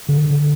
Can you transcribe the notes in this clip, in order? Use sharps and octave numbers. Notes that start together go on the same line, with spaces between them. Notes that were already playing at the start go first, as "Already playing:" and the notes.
D3
D3